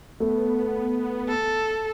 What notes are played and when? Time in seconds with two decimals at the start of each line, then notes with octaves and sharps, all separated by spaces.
0.20 A3 B3
1.28 A4